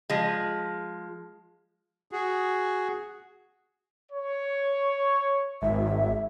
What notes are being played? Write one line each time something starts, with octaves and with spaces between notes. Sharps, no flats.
F3 G#3
F#4 G#4
C#5
G#1 E5